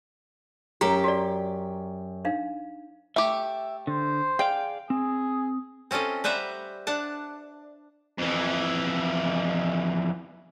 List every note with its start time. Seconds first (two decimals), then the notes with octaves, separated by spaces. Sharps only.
0.81 F#2 G4 G5 A#5
1.04 F#4 D5
2.25 D4 D#4 F5
3.16 A3 G4 E5
3.87 D3 C5
4.39 G#4 D5 F5 G5
4.90 C4 G#4
5.91 C4 C#4 F4 A4 D#5
6.24 G3 B4 C5 E5 F#5 A#5
6.87 D4 F#5 A5
8.18 F2 E3